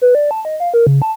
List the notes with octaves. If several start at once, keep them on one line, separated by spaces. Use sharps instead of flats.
B4
D5
A5
D#5
F5
A#4
C#3
A5